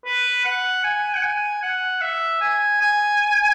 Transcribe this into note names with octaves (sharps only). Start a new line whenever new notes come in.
B4
F#5
G#5
F#5
G#5
F#5
E5
G#5
G#5